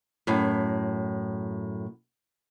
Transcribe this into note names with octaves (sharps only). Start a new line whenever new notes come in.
F#2 A2